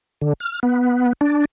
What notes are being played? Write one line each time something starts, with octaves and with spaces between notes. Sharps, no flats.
D3
F6
B3
D4